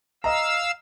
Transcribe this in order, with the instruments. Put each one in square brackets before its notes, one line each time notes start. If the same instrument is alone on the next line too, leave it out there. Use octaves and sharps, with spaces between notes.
[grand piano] D#5 A#5 [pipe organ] F5 E6